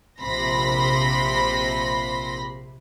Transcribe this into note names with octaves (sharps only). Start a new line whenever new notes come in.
A#1 C3 B5 C6 A#6